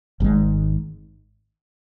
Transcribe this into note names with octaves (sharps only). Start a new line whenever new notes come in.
G#1 G#2 G#3